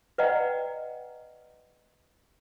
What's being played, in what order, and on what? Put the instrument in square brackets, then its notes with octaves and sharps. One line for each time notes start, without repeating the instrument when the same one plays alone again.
[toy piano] B4 D5 D#5 F#5 G5 A#5